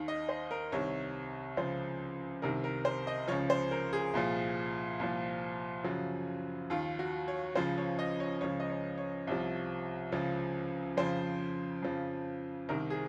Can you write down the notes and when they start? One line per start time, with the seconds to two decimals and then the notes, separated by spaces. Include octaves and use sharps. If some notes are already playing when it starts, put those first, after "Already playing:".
Already playing: D#2 D#3
0.08 D#5
0.29 C5
0.51 A#4
0.72 C2 C3 D#3 C#5
1.57 C#2 C#3 F3 C5
2.42 C2 C3 D#3 A#4
2.64 A#4
2.85 C5
3.07 D#5
3.28 C#2 C#3 F3 C#5
3.50 C5
3.71 A#4
3.93 G#4
4.14 C2 A#2 F3
4.99 C2 A#2 F3
5.84 F#2 C#3 F3 F#4
6.70 D#2 D#3 F4
6.99 F#4
7.28 C#5
7.55 C#2 C#3 F3 C5
7.78 C#5
7.99 D#5
8.20 C#5
8.41 C#2 C#3 F3 C#5
8.60 D#5
8.70 C#5
8.98 C#5
9.27 C2 C3 F3
10.12 C#2 C#3 F3
10.97 F2 C#3 F3 C5
11.83 F2 C#3 F3
12.69 C2 C3 D#3 A#4
12.90 G#4